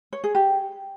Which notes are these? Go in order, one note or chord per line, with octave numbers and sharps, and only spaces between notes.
C#5
G#4
G4